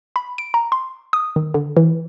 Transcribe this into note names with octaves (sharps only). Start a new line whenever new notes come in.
B5
D7
A#5
C6
D#6
D#3
D3
E3